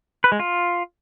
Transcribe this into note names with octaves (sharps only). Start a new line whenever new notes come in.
B4
G#3
F4